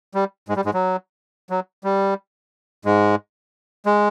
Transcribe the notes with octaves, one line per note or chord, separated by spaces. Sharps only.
G3
G#2 G#3
G3
G#2 G#3
F#3
F#3
G3
G#2 G#3
G#3